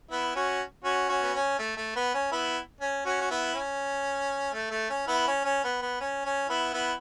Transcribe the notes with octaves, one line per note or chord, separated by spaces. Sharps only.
B3 E4
C#4 F#4
C#4 F#4
C#4 F#4
B3
C#4
A3
A3
B3
C#4
B3 E4
C#4
C#4 F#4
F#4
B3 E4
C#4
A3
A3
C#4
B3 E4
C#4
C#4
B3
B3
C#4
C#4
B3 E4
B3 E4